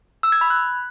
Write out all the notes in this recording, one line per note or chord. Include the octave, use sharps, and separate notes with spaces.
E6
G#6
B5
F#6